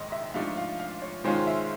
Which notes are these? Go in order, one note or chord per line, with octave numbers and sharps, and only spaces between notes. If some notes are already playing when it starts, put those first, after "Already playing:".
Already playing: A#1 G#2 D#3 G#3 D#5
E5
G#2 F3 A3 D4 F4 F5
F5
F5
C#5
G#2 D#3 G#3 C#4 F4 C5
E5